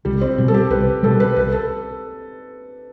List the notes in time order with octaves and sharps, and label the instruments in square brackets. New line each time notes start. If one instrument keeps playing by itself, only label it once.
[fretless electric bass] C2 [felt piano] G3
[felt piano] C4
[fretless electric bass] B2 G3
[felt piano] A4
G4
[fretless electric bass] C2 [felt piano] B4
[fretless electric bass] B2 G3 [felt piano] A4
[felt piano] B4
[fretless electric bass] C2 [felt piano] B4
[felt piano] A4